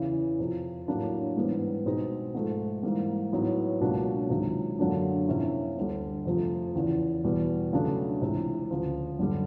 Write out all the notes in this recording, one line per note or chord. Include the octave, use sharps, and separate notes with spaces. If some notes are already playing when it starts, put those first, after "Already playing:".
Already playing: E2 C#3 E3
F2 C3 F3
A2 F#3 A#3 D4
G#2 E3 G3 B3
B2 G#3 C4 D#4
G#2 F3 A3
G#2 E3 G3 A#3
A2 F#3 B3 D#4
C#2 B2 F#3 A#3 D4
C#2 C3 D#3 F#3
F#2 D3 F#3 A#3 D4
C3 F3 A#3 C#4 E4
D2 D3 G3
F2 C3 F3 A3 C4
E2 C#3 E3
E2 B2 G3 B3
C#3 F#3 A3 D4
C#2 C3 E3
D2 C#3 F3
F#2 D3 G3